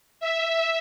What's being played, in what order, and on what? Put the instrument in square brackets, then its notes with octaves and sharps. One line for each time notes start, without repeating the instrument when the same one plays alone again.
[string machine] E5